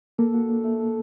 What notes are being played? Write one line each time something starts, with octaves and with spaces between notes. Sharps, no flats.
A#3 A4
F#4
D4
A3
A4